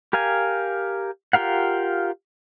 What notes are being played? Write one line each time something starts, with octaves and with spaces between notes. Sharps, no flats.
G4 A#4 F5 G#5
F4 G4 A#4 F5 F#5